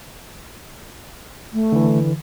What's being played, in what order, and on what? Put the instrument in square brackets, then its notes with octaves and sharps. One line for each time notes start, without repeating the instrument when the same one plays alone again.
[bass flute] A3
[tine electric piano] D3 E3